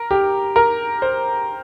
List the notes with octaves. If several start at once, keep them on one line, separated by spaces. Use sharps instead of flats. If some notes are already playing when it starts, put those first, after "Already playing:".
Already playing: A#4
G4
A#4
C5